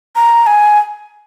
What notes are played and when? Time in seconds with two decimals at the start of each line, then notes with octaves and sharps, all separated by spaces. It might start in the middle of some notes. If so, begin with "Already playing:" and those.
0.16 A#5
0.47 G#5